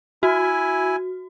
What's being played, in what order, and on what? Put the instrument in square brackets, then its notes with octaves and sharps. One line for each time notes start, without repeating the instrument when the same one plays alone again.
[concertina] E4 G#5 [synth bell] F#4